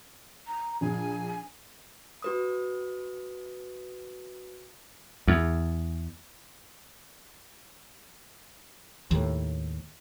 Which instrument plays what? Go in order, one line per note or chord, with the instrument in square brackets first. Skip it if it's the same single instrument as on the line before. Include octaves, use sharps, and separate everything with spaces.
[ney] A#5
[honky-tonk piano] A#1 [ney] G#5
[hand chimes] F#4 B4 D#6
[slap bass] E2
[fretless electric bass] D#2 A2